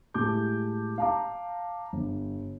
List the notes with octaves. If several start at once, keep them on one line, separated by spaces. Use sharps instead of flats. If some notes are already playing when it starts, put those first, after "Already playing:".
A2 G#3 G4 A5 D6 G6
F5 A5 A#5 D6
G1